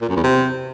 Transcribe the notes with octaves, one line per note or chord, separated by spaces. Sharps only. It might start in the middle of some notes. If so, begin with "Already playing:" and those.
A#2
F#2
E2
C3